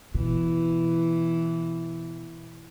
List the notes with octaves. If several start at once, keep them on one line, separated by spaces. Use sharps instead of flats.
B2 E3